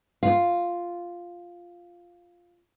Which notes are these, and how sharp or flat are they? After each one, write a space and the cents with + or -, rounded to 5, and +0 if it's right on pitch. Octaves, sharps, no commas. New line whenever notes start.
F4 +0 F5 +0